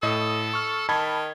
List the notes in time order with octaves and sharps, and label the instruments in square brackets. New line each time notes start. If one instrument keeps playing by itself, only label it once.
[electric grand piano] A2 D#5 D#6 [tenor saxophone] A4
[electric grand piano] C#6 F6
[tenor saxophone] D#3 [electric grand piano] A5 B5 G#6